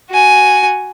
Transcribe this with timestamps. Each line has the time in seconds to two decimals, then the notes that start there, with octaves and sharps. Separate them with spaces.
0.10 F#4 G#5